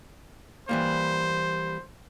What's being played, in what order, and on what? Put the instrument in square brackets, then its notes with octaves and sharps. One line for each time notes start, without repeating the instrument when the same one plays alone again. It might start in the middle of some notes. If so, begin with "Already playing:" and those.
[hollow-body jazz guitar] E3 G3 A#3 [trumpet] C5